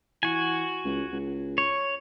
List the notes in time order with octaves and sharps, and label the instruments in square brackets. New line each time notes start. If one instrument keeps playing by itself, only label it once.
[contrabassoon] E3 [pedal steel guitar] F#4 G#5
[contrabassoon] C#2
C#2
[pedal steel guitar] C#5